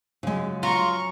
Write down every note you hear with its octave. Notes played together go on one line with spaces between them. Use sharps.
F#2 C#3 F3 F#3 G#3
F4 A#5 C#6